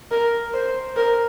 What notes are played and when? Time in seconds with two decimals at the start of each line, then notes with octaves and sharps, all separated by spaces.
0.11 A#4
0.54 C5
0.97 A#4